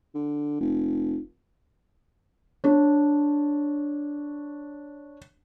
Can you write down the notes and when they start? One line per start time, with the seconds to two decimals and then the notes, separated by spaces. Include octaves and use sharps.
0.14 D3
0.60 F1
2.64 D4 C#5